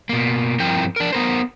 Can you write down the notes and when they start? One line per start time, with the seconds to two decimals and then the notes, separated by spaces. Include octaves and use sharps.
0.09 B2 A#3
0.60 G2 F3 C4 E4 A#4 G5
0.96 D4 A#4
1.12 B3 A#4 C5